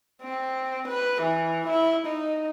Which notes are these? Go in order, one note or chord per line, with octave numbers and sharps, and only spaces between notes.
C4
B4
E3
E4
D#4